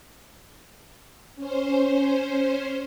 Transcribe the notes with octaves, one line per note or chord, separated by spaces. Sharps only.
C#4 C5